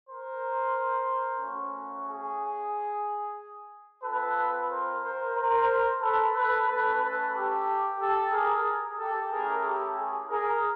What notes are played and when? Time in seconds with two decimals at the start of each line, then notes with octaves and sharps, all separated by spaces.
0.08 A#4 C5
1.40 A3 C#4 F#4
2.07 G#4
4.04 C4 F4 A4 B4
4.69 A#4 C5
5.03 A#4 C5
5.36 A#4 C5
6.01 A4 B4
6.35 A4 B4
6.67 A3 C#4 F#4 A4 B4
7.00 A4 B4
7.33 G4 A4
7.99 G4 A4
8.31 G#4 A#4
8.98 G4 A4
9.30 A3 C#4 E4 G4 G#4 A#4
9.63 G4 A4
9.97 G#4
10.29 G#4 A#4